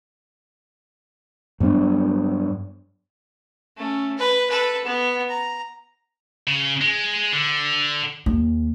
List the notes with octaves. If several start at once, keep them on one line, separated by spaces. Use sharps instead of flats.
G2 F#3 B3 D4
A3 C#4
B4
A4 B4
B3
A#5
C#3
G#3
D3
D#2